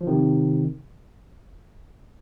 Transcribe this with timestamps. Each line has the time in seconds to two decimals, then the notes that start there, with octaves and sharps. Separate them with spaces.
0.01 F3
0.07 C3 D#3